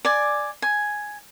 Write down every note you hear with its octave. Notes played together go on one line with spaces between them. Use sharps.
D5 G#5
G#5